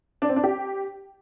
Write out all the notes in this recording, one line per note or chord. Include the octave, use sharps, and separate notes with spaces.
D4
C4
D4
G4